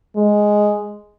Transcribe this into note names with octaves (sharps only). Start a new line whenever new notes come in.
G#3